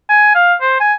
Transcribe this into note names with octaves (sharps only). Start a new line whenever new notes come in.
G#5
F5
C5
G#5